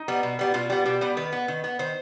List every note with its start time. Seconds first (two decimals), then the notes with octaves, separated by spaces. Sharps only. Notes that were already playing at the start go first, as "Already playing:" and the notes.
Already playing: D#4
0.08 G3 B3
0.23 B2
0.39 G3 B3
0.54 B2 F4
0.70 G3 B3
0.85 B2 G4
1.01 G3 B3
1.17 D#3 B4
1.32 B3
1.48 D#3
1.64 B3
1.79 D#3 C5